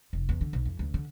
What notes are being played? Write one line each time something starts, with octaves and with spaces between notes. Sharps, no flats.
F1
E2
D3
B1
F2
D2
D3